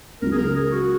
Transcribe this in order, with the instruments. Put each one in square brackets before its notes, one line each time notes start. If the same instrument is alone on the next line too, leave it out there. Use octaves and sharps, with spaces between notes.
[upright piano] C#2 C#3 F#3 [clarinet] A#4
[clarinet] G#4
A#4
G#4
F#4